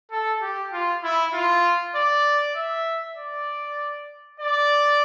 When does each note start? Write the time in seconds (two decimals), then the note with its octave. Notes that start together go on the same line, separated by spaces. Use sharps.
0.11 A4
0.42 G4
0.73 F4
1.04 E4
1.34 F4
1.95 D5
2.56 E5
3.17 D5
4.40 D5